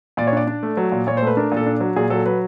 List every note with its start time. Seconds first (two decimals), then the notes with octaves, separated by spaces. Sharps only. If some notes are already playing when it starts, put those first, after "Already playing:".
0.17 A#2 D5
0.27 C#5
0.32 D4 D5
0.47 D4
0.63 A3
0.77 F#3
0.92 A#2
1.07 A#2 C#5
1.17 C5
1.22 A3 B4
1.37 D4 A#4
1.52 A#2 A4
1.66 D4
1.80 F#3
1.96 A#2 G#4
2.10 F#3 A4
2.26 F#3 B4